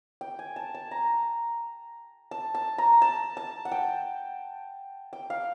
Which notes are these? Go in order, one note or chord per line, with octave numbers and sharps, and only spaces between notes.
G5
G#5
A5
A5
A#5
A5
A5
A#5
A5
A5
F#5
G5
G5
F5